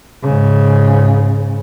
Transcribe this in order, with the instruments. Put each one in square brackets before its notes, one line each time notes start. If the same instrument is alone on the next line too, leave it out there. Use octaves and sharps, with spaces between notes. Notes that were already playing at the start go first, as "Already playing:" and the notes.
[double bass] G#2 C#3